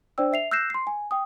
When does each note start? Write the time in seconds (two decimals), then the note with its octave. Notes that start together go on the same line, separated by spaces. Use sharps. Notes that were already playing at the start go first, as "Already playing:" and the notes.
0.18 D4 C5 D5 G5 E6
0.33 E5 C7 F7
0.51 E6 F#6 G6 A#6 C7 E7
0.70 C6 C7
0.87 G#5
1.11 G5 D#6